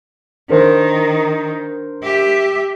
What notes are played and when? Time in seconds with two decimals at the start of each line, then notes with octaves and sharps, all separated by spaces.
0.49 D#3 D4 A#4 C5
2.03 G4 E5